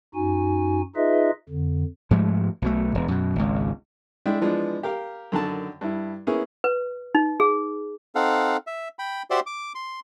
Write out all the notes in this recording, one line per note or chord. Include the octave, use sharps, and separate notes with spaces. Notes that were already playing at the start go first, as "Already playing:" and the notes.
F#2 D#4 F#4 G#5
D#4 F4 G#4 B4 D#5 E5
F2 D3
G#2 F3 G#3 A3
B1 B2 A3
E1
F#2 B2
G#1 C#2
G#3 D4 E4 E5 G5
E3 F3 G#3 B3 D4
G4 A#4 F5
F#2 D3 D#3 A5
G2 E4
A#3 B3 C#4 E4 G#4
B4
D#4
G#4
C4 D#4 A4 F5 F#5
E5
G5 B5
F#4 G4 C5 D5 E5 C6
D6
C6